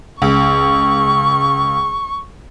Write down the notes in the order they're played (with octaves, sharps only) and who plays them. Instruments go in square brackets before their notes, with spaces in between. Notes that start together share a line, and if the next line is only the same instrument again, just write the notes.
[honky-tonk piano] C#2 [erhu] C#6